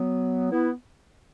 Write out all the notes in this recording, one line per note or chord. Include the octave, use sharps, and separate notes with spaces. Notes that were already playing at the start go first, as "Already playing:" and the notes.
Already playing: F#3 B3
B3 E4